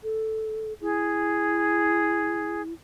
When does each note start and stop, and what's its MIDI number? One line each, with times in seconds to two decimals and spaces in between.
0.03 0.73 69
0.81 2.73 64
0.81 2.62 68